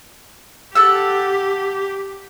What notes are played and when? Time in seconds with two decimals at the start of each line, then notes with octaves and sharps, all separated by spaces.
0.75 G4 A4 F#5 E6